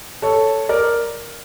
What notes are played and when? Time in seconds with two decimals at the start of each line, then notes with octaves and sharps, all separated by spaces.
0.22 A4 C#5
0.69 A#4 D5